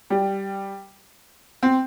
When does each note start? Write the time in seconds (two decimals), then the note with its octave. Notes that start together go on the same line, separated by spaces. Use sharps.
0.10 G3
1.63 C4